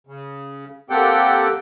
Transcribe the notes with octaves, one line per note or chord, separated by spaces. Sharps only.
C#3
A#3 C4 G4 A4 F#5 G5